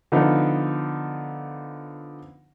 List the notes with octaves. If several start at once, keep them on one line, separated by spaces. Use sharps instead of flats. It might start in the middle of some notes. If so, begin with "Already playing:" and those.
D3 F3 B3 D#4